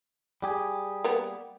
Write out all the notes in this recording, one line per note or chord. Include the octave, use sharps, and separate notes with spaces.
G3 G4 G#4
A#3 B3